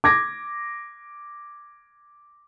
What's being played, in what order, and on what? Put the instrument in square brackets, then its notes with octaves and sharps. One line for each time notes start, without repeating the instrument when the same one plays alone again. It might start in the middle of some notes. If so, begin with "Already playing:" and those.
[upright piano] D6 G#6 A#6